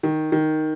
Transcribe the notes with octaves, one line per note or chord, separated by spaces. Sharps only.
D#3
D#3